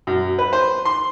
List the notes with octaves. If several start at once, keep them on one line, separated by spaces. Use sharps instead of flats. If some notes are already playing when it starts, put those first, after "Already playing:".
F#2
B4
C5
C6